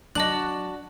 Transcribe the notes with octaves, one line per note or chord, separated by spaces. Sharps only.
F#3 D4 F#4 D#5 A5 F#6 F#7